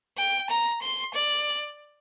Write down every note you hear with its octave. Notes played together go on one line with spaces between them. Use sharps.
G5
A#5
C6
D5